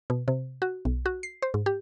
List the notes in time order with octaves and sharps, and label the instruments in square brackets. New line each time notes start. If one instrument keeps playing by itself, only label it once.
[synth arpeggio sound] B2
C3
F#4
B1
F#4
C7
C5
G#2
G4